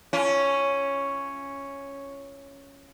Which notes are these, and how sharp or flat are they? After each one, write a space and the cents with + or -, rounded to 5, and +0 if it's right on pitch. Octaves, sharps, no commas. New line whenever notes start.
C#4 +0 F4 -40